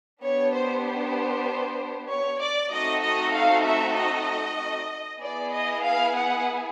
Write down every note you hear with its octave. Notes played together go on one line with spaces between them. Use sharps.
B3 D4 G4 C#5
C5
C5
C#5
D5
A3 C4 D#4 F#4 A4 D#5
D#5
F5
E5
D#5
B3 E4 G#4 D5
D#5
F5
F#5